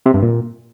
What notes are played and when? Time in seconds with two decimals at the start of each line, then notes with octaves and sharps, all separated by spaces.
0.06 C3
0.14 G2
0.22 A#2